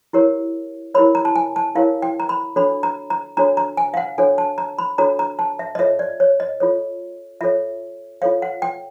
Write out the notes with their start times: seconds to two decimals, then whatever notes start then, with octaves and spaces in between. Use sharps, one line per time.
0.13 E4 G4 A#4 C#5
0.94 E4 G4 A#4 C#5 B5
1.15 A#5
1.25 A5
1.36 G#5
1.56 A5
1.75 E4 G4 A#4 C#5 F5
2.02 G5
2.20 A#5
2.29 B5
2.56 D4 F#4 A4 C#5 B5
2.83 A#5
3.10 A#5
3.37 D4 F#4 A4 C#5 A#5
3.57 A#5
3.77 G#5
3.94 F5
3.97 F#5
4.18 D4 F#4 A4 C#5 G#5
4.38 A5
4.58 A#5
4.78 B5
4.98 D4 F#4 A4 C#5 A#5
5.19 A#5
5.39 A5
5.59 E5
5.75 D#5
5.79 F4 A4 C#5 E5
5.99 D5
6.20 C#5
6.40 D#5
6.60 F4 A4 C#5
7.41 F4 A4 C#5 E5
8.22 F4 A4 C#5 F5
8.42 F#5
8.62 G5